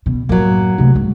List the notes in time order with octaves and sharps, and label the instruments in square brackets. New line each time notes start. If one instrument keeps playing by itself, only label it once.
[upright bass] B2
[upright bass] F#2 A2 [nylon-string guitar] F#3 A#3
[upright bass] C3 A3
G2 G#3